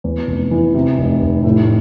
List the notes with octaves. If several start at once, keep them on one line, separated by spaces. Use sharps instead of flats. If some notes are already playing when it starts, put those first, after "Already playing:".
E2
F1
E3
C3
F1
F1
A2